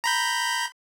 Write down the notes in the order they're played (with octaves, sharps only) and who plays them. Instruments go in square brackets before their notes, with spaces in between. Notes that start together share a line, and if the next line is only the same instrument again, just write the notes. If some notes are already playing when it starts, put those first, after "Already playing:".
[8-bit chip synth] A#5 B5 G6